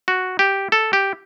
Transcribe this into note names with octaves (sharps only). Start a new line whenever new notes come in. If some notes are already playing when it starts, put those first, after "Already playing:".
F#4
G4
A4
G4